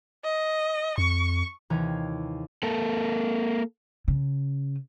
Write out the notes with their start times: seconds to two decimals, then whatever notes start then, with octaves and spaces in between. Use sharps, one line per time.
0.25 D#5
0.98 F2 C#6
1.70 D#2 C3 E3 C#5 A#5 G#6
2.63 A#3 A4
4.08 C#3